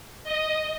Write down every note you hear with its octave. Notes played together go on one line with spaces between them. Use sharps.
D#5